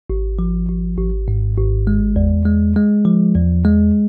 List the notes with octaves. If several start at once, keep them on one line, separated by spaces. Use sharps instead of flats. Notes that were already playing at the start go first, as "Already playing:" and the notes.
G#1
F3
G#1
G#1
G#2
G#1
G#3
E2
G#3
G#3
F3
E2
G#3